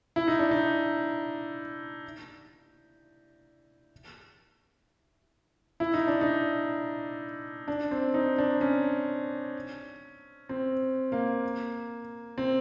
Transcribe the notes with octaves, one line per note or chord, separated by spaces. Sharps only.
E4
D#4
D4
D#4
E4
D#4
D4
D#4
D4
C4
D#4
D4
C#4
C4
A#3
C4